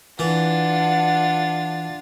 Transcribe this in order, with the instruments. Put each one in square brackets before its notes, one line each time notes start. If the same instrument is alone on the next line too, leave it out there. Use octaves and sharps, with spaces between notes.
[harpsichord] E3 [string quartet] D4 F4 A6 [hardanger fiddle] F#5